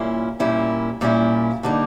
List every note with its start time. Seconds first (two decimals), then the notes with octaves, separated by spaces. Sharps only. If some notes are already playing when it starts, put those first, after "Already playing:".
Already playing: A#2 G3 A#3 C#4 E4
0.40 A#2 G3 A#3 C#4 E4
1.01 A#2 G3 A#3 C#4 E4
1.63 D3 G3 A#3 D#4